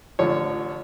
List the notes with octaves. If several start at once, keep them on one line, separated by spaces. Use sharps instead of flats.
A1 D3 F3 C#5